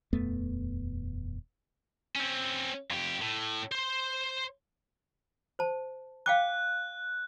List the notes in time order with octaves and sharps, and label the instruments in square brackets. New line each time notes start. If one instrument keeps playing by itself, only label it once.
[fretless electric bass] D#1 F2 A3 B3
[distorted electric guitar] C4 C#4
F2 G4
A2
C5 C6
[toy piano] C5 A5
[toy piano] F5 G5 D6 [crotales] F#6